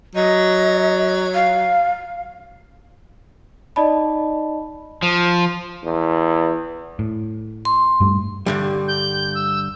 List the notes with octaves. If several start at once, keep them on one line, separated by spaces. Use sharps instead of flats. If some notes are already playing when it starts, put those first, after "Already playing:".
F#3 D#5
F5
D#4 D5 D#5 A5 B5
F3
E2
A2
C6
G2 G3 A3
G2 D3 G3
G6
E6